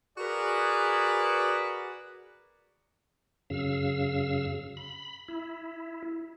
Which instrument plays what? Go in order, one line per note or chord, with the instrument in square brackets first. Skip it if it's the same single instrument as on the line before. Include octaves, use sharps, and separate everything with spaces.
[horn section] F#4 G#4 A#4 B4 D5
[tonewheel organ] F#2 C#3 F5 E6
B5
E4